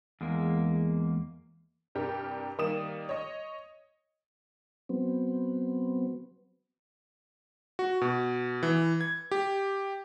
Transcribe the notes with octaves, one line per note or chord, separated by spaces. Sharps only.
E2 G#3 A#3
C2 G2 G4 A#4
D#3 G3 A#3 D#6 E7
C#5 D#5
F#3 B3 C4
F#4
B2
E3
G#6
G4